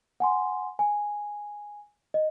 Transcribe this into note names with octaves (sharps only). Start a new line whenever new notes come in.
F#5 G#5 C6
G#5
D#5